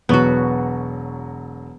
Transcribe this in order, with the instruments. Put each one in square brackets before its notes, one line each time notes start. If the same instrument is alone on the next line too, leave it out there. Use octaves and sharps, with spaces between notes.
[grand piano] E1 F#3 C#6 [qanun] B3 F#4